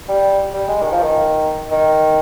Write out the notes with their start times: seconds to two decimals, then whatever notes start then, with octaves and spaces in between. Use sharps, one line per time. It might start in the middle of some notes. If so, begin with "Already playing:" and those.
0.08 G3
0.53 G3
0.68 G#3
0.82 D#3
0.92 F3
1.02 D#3
1.72 D#3